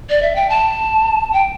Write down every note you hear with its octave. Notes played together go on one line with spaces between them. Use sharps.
D5
E5
G5
A5
G5